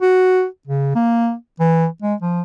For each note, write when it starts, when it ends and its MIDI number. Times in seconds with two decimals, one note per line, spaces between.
0.02 0.45 66
0.67 0.94 49
0.95 1.34 58
1.60 1.87 52
2.02 2.14 56
2.22 2.42 53